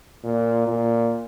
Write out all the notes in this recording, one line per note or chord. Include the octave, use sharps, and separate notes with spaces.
A#2
A#2